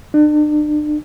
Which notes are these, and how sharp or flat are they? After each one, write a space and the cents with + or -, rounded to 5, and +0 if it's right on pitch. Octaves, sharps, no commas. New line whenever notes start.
D4 +40